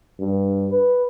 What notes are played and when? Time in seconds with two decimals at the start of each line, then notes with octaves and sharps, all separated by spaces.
0.20 G2
0.72 B4